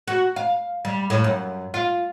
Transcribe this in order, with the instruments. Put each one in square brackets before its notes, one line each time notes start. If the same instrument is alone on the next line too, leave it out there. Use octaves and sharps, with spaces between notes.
[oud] F#4
F5
G3
A2
F#2
F4